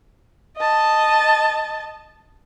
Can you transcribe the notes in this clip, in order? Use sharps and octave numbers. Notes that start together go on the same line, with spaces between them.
D#5 A5